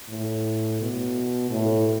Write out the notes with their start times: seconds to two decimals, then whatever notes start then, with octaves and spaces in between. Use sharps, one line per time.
0.10 A2
0.81 B2
1.50 A2